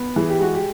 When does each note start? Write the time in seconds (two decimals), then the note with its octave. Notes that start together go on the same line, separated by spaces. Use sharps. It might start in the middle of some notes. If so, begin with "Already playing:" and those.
Already playing: B3
0.16 E3 G#4
0.29 G4
0.39 G#3 F#4
0.54 G4